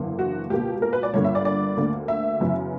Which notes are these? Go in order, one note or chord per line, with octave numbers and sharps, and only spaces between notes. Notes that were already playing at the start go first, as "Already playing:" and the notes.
Already playing: F#1 E2 D3 A#3
F#4
C#2 B2 A#3 G4
A#4
B4
D5
G1 G2 D3 A#3 C#5
E5
D5
D5
D2 D3 A#3
E5
F#2 C#3 E3 B3